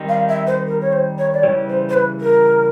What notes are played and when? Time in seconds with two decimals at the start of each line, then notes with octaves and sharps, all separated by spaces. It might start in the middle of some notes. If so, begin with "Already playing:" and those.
Already playing: D#3 G3 C4 D#4
0.09 F5
0.29 E5
0.47 C5
0.67 A#4
0.82 C#5
0.93 C5
1.18 C#5
1.34 D5
1.43 C#3 E3 G3 C#5
1.69 C5
1.89 C5
1.94 B4
2.21 A#4